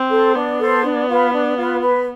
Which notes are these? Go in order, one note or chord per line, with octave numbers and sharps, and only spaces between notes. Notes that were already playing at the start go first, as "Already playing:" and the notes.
Already playing: C4
A4 C5
B3 D4
A4 C5
D4
F4 B4
D4
F4 B4
B4